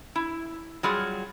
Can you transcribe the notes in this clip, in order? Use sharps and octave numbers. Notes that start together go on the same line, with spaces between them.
E4
F#3 G3 F4 G#4